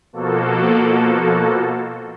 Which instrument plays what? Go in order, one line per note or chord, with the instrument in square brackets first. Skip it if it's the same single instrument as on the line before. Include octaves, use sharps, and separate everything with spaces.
[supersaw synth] B2 F3 A#3 F#4 A4